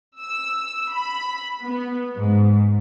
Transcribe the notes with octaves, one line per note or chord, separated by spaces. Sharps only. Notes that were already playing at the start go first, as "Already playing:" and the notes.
E6
B5
B3
G#2